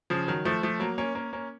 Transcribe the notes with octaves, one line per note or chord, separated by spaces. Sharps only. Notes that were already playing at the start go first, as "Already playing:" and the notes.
C#3 F3
D#3 F#3
F3 A3
F3 A3
F#3 A#3
A#3 C#4
A#3 C#4
A#3 C#4